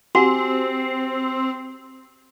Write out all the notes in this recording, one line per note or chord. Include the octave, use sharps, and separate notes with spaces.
C4 F#4 G4 F#5 G#5 C6